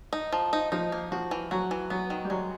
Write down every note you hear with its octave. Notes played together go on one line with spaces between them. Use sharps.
D#4
F3
D#4
F3 D#4
A#3
F3 F#4
E3
F#3 F#4
E3
F#3 B3
D#3
G3
F#3 G#3